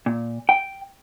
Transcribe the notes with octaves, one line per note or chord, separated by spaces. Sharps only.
A#2
G5